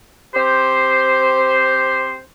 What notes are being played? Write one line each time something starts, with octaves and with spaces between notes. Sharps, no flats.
C4 G4 C5